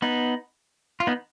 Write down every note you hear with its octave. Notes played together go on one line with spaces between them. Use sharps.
B3 D#4
F4
B3 D#4